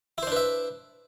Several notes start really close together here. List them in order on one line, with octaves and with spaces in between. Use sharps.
E4 C5 D4 B4 E5